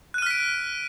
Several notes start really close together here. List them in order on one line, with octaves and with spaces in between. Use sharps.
F#6 D#7 F6 B6 D7